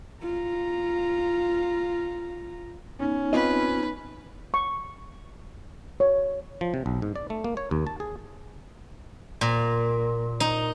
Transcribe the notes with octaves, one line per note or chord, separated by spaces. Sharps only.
F4 A#5
B3 C#4 D#4
C4 F4 B4 D#5
C#6
C#5
F3
C3
B1
G#2
D5
A3
A#3
C#5
D#2
A5
G#4
A#2
D#4